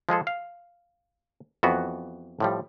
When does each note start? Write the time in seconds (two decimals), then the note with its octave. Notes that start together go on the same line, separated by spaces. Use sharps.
0.09 F3 G#3 G#4 A4
0.27 F5
1.63 F2 E3 B3 F#4
2.40 A2 F3 G3